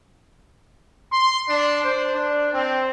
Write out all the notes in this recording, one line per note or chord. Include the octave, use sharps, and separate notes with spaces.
C6
D4
C5
D4
C4